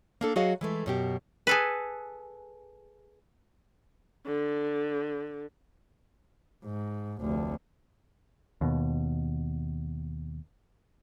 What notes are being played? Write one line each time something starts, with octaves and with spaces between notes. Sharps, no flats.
A#3 D4 A4
F#3 F#4 G#4 D#5 F5
E3 G#3 A3
F#2 B2 G4
G#4 A4 B4
D3
G#2
F1 D2
D#2 B2